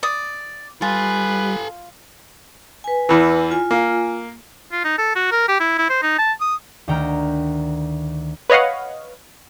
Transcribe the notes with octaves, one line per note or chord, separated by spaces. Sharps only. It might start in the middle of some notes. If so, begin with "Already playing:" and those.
D5 D#6
G3 F4 A4 B4 G#5
B4 G#5
E2 E3
F4 G#5
A#3
F4
D#4
A4
F#4
A#4
G4
E4
E4
C5
D#4
A5
D#6
D2 D#3 G5 A#5 F6
B4 C#5 D#5 F5 F#5